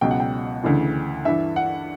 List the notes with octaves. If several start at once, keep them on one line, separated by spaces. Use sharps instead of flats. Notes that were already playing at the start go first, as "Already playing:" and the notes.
C#2 B2 F#3 G5
F#5
G5
D2 C#3 E3
G2 E3 E5
F#5